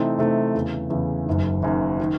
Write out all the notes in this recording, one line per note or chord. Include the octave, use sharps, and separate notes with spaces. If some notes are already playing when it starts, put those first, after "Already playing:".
Already playing: C3 E3 A3 C4 D#4
C3 E3 A3 C4 D#4
E2 C#3 E3
E2 C#3 E3
F#1 F#2 D#3
F#1 F#2 D#3
D#3